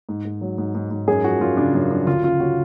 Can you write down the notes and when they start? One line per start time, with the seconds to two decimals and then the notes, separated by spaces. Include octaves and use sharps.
0.09 G#2
0.25 G#2
0.41 F#3
0.58 G#2
0.75 G#2
0.91 G#2
1.07 F#2 G#4
1.24 F3 F#4
1.40 F#2 F4
1.57 C#3 D4
1.74 F#2
1.91 F3 D4
2.07 D2 F4
2.24 C#3 F4
2.40 C#3 F#4